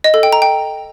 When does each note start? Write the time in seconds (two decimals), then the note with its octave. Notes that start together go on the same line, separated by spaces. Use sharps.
0.04 D#5
0.14 A4
0.23 G5
0.33 A#5
0.42 G5